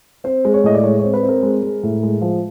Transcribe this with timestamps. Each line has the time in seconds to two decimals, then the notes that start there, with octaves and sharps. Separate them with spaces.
0.24 C4 C5
0.45 G#3
0.54 C#5
0.64 A2 D#5
0.75 D5
0.83 G#3 C#5
0.99 C4 C#5
1.14 B4
1.23 C4
1.29 A#4
1.42 G#3
1.62 G#3
1.83 A2
2.03 G#3
2.21 F3